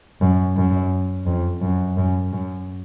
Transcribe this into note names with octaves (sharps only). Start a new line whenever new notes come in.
F#2
F#2
F2
F#2
F#2
F#2